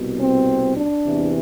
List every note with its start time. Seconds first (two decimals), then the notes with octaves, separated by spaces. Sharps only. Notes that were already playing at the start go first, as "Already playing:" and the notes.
Already playing: C2 B2
0.20 C4
0.76 D4
1.05 E2 C3 E3